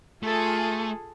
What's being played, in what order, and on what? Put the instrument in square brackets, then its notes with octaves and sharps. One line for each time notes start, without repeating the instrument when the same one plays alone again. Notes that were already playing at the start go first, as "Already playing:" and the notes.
[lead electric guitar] A3 [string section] F4 G#4 A4